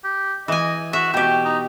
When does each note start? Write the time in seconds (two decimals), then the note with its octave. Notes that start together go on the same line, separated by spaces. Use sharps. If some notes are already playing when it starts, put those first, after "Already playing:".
0.04 G4
0.48 E3 D#5 G#5
0.93 F#4 E5
1.14 B2 G4 G5
1.45 D#4